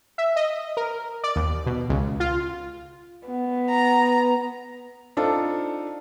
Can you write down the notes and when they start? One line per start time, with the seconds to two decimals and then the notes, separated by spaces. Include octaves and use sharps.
0.18 E5
0.36 D#5
0.77 A#4
1.24 D5
1.36 D#2
1.66 B2
1.89 C#2
2.20 F4
3.28 B3
3.68 A#5
5.17 C4 D4 D#4 F4 A4